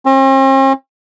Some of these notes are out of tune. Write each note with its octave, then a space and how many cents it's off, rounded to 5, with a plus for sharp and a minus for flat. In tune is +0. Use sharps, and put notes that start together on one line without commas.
C4 +45